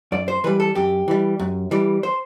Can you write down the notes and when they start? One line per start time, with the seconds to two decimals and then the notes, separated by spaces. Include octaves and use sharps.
0.12 F#2 D5
0.28 C5
0.44 E3 G3 B4
0.60 A4
0.75 F#2 G4
1.08 E3 G3
1.39 F#2
1.71 E3 G3
2.03 C5